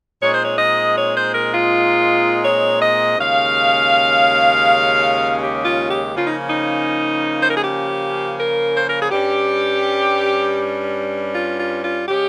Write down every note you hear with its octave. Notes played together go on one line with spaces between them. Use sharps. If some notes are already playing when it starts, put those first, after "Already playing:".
A#2 G#3 C4 D#4 C#5
C5
C#5
D#5
C#5
C5
A#4
F4
C#5
D#5
D#2 C#3 G#3 C#4 F5
G4
F4
G4
C#3 F3 A#3 C#4 F4
D#4
D#4
C5
A#4
G#4
G4
A#4
C5
A#4
G#4
G2 G3 C#4 G4
F4
F4
F4
C#3 G#3 C#4 G4